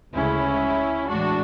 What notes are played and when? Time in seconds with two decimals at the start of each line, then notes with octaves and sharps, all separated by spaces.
0.14 D2 C#3 G#3 C#4 E4
1.09 A2 E3 G#3 D4 F#4